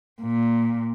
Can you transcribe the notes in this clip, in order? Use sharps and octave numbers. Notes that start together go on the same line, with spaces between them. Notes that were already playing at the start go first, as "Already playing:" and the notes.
A#2